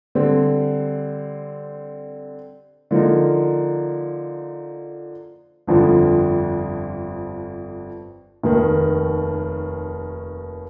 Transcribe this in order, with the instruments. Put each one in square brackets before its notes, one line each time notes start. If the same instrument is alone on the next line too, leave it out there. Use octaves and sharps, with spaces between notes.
[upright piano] D3 G3 C4
D3 F3 A#3 D#4
G1 F2 D3 F3
F1 D#2 D#3